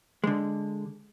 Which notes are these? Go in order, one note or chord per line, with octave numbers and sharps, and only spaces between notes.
D3 G#3